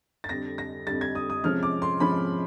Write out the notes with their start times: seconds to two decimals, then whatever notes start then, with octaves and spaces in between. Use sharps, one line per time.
0.24 A6
0.29 F2 D3 G3 A#6
0.58 A#6
0.87 F2 D3 G3 A6
1.01 G#6
1.15 D#6
1.30 D#6
1.43 C3 F3 G#3 C#4 F6
1.63 D6
1.82 C6
2.00 C3 F3 G#3 C#4 B5